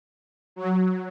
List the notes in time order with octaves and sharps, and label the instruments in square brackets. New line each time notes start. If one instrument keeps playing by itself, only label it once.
[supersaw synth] F#3